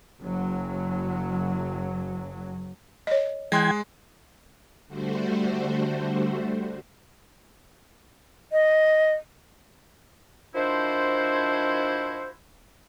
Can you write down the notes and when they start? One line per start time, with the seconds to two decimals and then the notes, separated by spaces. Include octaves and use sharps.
0.20 F#1 F#3
3.07 C#5 D#5
3.52 E3 G#3 G5 C6 F#6 G#6
4.88 D3 G3 A3 F#4 C5
8.52 D#5
10.55 D#3 F3 D4 E4 F#4 C5